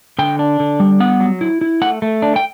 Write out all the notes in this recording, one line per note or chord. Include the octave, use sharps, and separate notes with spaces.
D3 G5
D4
D3
G3
B3 F#5
F#3
E4
E4
A3 F#5
A3
D4
G5